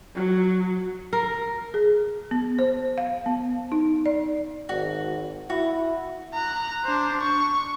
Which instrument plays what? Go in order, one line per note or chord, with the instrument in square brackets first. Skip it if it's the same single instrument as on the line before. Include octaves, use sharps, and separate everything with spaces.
[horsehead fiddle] F#3
[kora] A#4
[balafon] G#4
B3
C5
F5
B3
D#4
D5
[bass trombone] G#1 [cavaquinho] F#4
[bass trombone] E4 [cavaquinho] F#4
[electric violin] A#5 F#6
D4 C5
C#6